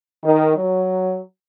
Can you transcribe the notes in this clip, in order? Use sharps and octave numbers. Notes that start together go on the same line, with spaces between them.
D#3
F#3